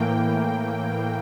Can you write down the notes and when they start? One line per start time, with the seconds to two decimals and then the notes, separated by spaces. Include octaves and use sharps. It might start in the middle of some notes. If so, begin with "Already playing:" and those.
Already playing: A2 E3 A#3 G5